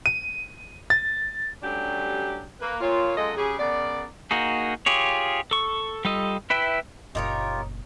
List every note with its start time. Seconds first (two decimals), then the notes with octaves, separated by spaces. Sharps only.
0.06 D#7
0.90 A6
1.63 F#3 G3 A3 C#4 D4 G4
2.60 A#3 B4
2.81 A#2 F4 C#5
3.17 F#2 G#3 F4 A4 D#5
3.36 C#3 F#3 G4 G#4
3.59 C#3 B3 A#4 D5
4.31 A#3 D#4 F#4 G#4
4.86 F4 G4 G#4 C#5
5.51 A4 C#6
6.05 G3 F4 A4 D#5
6.50 E4 B4 E5 G5
7.15 F#1 A#2 D#4 F4 G4 A#4 C#5